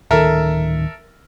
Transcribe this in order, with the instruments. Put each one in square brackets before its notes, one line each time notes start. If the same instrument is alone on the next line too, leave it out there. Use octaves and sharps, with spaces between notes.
[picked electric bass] D1 D#3 [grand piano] A4 A#4 E5